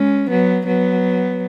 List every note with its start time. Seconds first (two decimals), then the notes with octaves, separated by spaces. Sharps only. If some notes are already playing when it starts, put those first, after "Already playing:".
Already playing: G#3 C#4
0.30 F#3 B3
0.67 F#3 B3